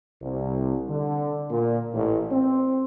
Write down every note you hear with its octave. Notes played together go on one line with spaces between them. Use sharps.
C2
D3
A#2
A1
C4